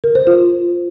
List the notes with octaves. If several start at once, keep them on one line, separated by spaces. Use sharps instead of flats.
A#4
C5
F4